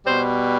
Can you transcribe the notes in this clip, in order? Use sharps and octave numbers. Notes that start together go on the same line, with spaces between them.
B2 G3 C5